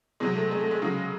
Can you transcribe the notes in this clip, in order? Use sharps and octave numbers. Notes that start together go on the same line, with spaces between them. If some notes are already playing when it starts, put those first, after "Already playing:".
C3 F#3 G#3
A3
G#3
A3
G#3
C#3 F#3